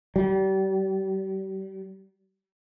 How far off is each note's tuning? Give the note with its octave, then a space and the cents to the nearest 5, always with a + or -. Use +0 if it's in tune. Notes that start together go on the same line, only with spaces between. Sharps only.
G3 -35